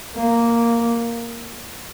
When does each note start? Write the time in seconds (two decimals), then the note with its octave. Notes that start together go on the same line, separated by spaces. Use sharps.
0.15 A#3